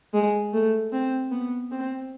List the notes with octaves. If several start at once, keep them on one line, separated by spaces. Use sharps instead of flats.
G#3
A3
C4
B3
C4